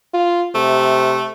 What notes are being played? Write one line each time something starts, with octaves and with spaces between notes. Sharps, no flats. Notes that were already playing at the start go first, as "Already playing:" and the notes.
F4
C3 A3